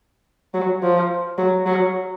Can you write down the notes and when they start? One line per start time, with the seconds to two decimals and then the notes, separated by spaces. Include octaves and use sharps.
0.54 F#3
0.82 F3
1.38 F#3
1.66 F#3